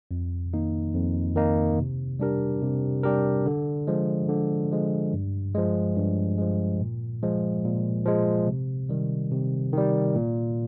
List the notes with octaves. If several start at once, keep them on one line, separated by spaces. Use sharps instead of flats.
F2
D#3 A#3 D#4
F2
D#3 A#3 D#4
C3
G3 D4 G4 A#4
C3
G3 D4 G4 A#4
D3
F3 G#3
D3
F3 G#3
G2
F3 G#3
G2
F3 G#3
A#2
F3 G#3
A#2
F3 G#3
C3
D#3 G3
C3
D#3 G3
A#2